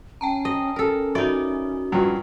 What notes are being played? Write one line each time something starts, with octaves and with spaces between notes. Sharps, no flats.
C#4 G5 A5 A#5
D#5
C#4 A4 A#4
D#4 F#4 D5 E5
G2 F3 F#3